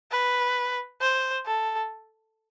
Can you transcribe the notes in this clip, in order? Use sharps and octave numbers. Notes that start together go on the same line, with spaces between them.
B4
C5
A4